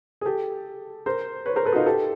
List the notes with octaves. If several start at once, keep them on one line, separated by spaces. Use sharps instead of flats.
G#4
G4 A4
A#4 C5
B4 C#5
A#4 C5
A4 B4
F#4
D#4 F4
G4 A4